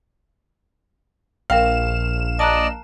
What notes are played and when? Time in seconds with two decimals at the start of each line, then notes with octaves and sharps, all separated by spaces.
1.50 A#1 A#4 F5 G5 E7
2.39 D5 D#5 A5 A#5 F#6